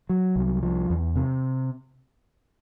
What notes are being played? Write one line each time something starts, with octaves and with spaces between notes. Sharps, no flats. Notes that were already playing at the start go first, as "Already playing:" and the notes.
F#3
C2
F3
E2
C3